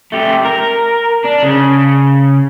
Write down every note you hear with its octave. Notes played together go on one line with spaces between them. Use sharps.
A3 G4
A#4
D4
C#3